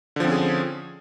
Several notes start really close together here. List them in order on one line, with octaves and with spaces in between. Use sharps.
D3 F3 C4 C#4 G#4